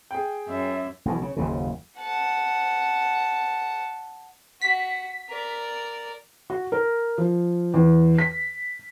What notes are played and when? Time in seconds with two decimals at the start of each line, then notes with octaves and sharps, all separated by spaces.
0.11 G#4 G5
0.48 F#2 E5
1.05 B1 B2 E3
1.22 C#3
1.37 F#1 D#2 C#3
1.99 F#5 A5
4.61 F#4 B6
5.29 A#4 D5
6.50 F#4
6.72 A#4
7.18 F3
7.74 E2
8.18 B6